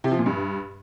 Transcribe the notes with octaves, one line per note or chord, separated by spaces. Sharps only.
C3
F3
A#2
G2